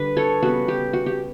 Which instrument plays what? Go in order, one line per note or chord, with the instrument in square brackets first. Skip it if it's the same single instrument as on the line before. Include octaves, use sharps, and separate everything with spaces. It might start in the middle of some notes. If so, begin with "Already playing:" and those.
Already playing: [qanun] D3 G3 D4 B4
A4 C#5
C#3 G3 B3 F#4
G4
F#4
G4